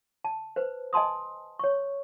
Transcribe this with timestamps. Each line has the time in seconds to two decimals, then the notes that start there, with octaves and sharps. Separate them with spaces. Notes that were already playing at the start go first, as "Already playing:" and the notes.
0.24 A5
0.56 B4 C5
0.93 D#5 G#5 A5 C6 D#6
1.59 C#5 C#6